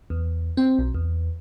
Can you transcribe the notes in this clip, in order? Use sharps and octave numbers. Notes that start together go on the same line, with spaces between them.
E2
C4
B1
E2